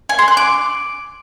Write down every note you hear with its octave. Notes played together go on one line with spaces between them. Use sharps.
G#5
C6
F#6
D6